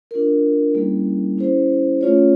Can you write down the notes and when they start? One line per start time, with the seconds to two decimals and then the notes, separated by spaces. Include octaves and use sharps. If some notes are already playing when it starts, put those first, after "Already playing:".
0.11 D4 F4 A#4
0.74 G3 A#3 C#4 E4 G#4
1.38 C#4 E4 G#4 C5
2.01 A3 C#4 F4 G#4 C#5